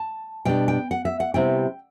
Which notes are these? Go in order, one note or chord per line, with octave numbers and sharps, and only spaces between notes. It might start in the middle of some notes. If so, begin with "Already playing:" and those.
Already playing: A5
B2 G3 D4 G5
G5
F#5
E5
F#5
C3 G3 B3 E4 G5